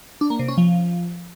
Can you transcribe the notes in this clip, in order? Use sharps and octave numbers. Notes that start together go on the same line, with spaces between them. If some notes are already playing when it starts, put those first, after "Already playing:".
D4
A#3
C3
C#4
F3